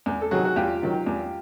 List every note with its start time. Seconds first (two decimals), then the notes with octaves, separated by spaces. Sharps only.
0.06 E2
0.21 A4
0.31 C3 D#3 F#3 F#4 G#4
0.45 F#4
0.56 E2 F4 G4
0.82 C3 D#3 F#3
1.07 E2